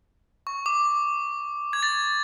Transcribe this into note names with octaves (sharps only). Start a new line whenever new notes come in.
C#6
D6
G#6
A6